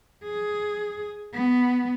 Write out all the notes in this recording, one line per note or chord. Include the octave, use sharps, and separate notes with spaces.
G#4
B3